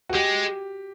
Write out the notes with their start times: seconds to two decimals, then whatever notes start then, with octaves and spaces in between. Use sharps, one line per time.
0.09 F#4
0.13 G#3 G4